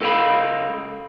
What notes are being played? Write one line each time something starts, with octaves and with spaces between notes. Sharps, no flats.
C#2 A4 A#4 E5 F5 B5